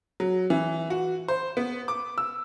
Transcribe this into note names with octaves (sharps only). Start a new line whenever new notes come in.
F#3
E3
F#4
C5
B3
D6
E6